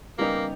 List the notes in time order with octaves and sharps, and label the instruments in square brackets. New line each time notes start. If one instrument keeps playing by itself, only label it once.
[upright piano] C#3 G3 B3 D#4 G4 [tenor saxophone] A#3